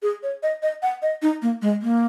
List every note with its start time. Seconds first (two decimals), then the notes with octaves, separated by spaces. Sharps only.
0.02 G#4
0.23 C#5
0.43 D#5
0.63 D#5
0.83 F#5
1.02 D#5
1.22 D#4
1.42 A#3
1.62 G#3
1.82 A#3